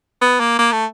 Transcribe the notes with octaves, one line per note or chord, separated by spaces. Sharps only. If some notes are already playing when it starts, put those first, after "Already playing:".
B3
A#3
A#3
A3